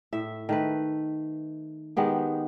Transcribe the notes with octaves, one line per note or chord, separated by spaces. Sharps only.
A2 E5
D#3 A3 B4
D#3 G#3 B3 G4